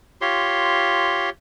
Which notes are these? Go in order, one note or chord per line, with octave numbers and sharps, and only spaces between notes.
F4 G4 C#5 C6